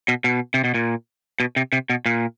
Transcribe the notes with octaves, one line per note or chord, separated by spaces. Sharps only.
B2
B2
C3
B2
A#2
B2
C3
C3
B2
A#2